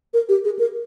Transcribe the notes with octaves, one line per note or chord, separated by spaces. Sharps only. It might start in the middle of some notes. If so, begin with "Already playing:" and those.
A#4
G4
G#4
A#4